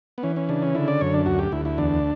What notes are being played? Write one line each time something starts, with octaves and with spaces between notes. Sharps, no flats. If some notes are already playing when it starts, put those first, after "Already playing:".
B3
E3 C#4
C#4
C#3 D4
C#4
D3 E4
D5
F#2 C#5
D4
D2 F#4
G4
D2 E4
E4
E2 D4